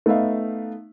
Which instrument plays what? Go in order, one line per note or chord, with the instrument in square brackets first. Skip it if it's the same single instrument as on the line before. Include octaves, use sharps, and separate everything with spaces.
[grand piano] A3 B3 D#4 E5 F5